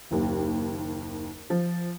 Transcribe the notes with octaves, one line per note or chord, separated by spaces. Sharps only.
F#1 D#2
F3